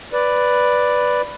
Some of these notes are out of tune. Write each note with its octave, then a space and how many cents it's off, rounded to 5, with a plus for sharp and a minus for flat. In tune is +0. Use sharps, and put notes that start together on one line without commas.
B4 +0 D5 +0